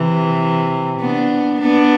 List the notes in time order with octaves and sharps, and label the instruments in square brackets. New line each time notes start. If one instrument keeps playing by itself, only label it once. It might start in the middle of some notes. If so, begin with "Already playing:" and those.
Already playing: [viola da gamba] C3 E3
B3 D4
B3 D4